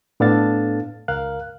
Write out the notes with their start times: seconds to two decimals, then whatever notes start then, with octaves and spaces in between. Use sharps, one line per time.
0.20 A2 B3 D4 A4 F5 A6
1.08 C#2 A#4 F5 F#6